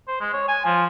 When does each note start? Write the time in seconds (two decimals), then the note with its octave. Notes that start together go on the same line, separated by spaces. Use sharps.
0.08 C5
0.20 G#3
0.33 C#5
0.48 G#5
0.65 F3